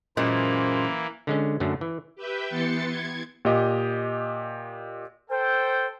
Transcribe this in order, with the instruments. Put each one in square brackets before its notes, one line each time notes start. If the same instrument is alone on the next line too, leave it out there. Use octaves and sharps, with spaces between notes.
[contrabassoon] F#2 [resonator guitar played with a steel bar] A#2 G#3 [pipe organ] E3 A#3 [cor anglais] C5
[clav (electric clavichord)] D3 G#3 C#4
F#2 D3 F#3 A3
E3
[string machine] G4 B4 E5 G5
E3 B3 C6 A6 C#7
G#6
[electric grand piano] A#2 G4 D#5
[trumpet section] A4 G5 [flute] C5